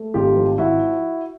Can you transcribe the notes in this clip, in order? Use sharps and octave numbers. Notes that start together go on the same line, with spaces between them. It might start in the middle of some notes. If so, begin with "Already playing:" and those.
Already playing: A3
G#1 F4 G4
F3
G#1 E4 F#4